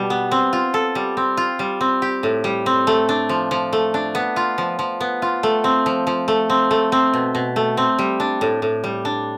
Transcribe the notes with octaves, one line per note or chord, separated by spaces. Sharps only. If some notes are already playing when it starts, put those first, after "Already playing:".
Already playing: B2 G3 D4
B3
C4
F4
A4
G3
C4
F4
G3
C4
G4
A2
G3
C4
A3
D4
F3
F3
A3
D4
B3
F4
F3
F3
B3
F4
A3
C4
F3
F3
A3
C4
A3
C4
B2
B2
A3
C4
G3
D4
A2
A2
G3
D4